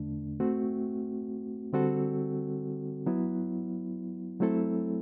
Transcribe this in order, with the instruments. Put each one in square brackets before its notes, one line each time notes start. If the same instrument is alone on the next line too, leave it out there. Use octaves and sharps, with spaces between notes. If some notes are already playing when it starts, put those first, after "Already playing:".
Already playing: [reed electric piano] E2 D3 A3 D4
A3 C4 F#4
D3 G3 C4 F#4 A4
F#3 B3 E4
F#3 A3 C4 E4 A4